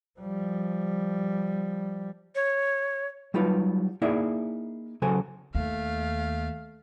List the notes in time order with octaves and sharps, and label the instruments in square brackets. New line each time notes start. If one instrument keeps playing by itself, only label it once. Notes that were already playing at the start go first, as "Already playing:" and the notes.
[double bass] F3 G3
[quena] C#5
[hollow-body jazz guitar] F#3 G3 D#4 F4 B4
A#3 D#4 E4 G#4 D5 E5
C#3 F#3 A4 C5 G#5
[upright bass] D#2 [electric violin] A3 F5